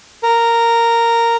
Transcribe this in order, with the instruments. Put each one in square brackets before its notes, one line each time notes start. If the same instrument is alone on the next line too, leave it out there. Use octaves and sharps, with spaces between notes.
[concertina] A#4